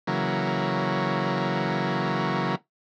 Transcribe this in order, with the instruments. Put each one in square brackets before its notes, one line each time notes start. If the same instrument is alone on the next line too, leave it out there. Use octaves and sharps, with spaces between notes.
[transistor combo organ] C#3 E3 F#3 A#3